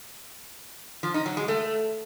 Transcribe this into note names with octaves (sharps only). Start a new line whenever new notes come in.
F3
D#4
F#3
G#3
A3